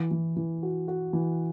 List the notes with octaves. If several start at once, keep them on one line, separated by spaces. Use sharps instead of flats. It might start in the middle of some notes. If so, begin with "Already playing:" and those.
Already playing: E3
E3
E3
F#4
F#4
E3